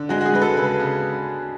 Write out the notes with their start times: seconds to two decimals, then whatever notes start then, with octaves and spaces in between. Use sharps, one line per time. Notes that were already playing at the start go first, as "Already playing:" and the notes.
Already playing: D3
0.09 G#3 F#4
0.21 F#4
0.26 G#4
0.34 G#3 B4
0.42 A4
0.57 C#3 B4
0.80 C#3